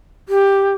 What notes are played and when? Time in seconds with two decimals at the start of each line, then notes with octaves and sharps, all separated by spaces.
0.29 G4